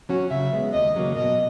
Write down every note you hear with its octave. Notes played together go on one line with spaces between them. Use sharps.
F#3 C#4 F#4
C#3 E5
G#3 B3
D#2 D#5
C#3 F#3 A#3
B2 D#5